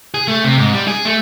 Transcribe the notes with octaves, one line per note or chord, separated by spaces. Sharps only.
G#4
A3
C3
G#2
G3
G#4
A3